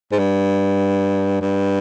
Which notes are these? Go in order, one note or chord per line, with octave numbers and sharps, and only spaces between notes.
G#2
G2
G2